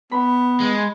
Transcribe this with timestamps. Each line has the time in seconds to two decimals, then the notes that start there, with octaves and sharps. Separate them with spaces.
0.12 B3 B5
0.60 G#3